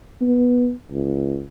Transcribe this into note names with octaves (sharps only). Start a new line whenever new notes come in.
B3
C#2